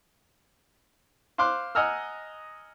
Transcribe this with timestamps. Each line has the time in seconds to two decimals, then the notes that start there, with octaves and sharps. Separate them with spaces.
1.38 C5 F5 C6 D6 F#6
1.75 D#5 F#5 G#5 A#5 E6 F6